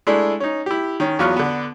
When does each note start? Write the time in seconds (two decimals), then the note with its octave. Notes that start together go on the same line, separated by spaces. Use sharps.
0.07 G#3 A3 D4 E4
0.40 C#4 D#4
0.66 E4 G4
1.00 D#3 C#4
1.19 E2 F#3 B3 F4 C#6 F6
1.37 D3 B3